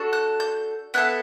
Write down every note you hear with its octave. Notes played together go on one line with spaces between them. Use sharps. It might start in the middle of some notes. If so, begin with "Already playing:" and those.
Already playing: D4 F#4 A4
F#6
G6
B3 E4 A4 F#6